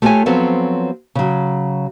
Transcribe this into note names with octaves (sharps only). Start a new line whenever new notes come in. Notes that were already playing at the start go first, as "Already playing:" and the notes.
A3 F4 G4 A4 C#5 G#5
F3 F#3 B3 C4 A4 C#5
C#3 F#3